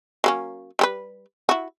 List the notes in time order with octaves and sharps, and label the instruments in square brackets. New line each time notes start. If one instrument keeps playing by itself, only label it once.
[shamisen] F#3 A#3 C#4
G3 G4 B4
E4 F#4